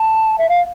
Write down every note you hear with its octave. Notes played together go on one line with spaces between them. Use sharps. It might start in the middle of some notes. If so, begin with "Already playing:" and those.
Already playing: A5
E5
F5